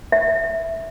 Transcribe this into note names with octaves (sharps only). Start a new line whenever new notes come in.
E5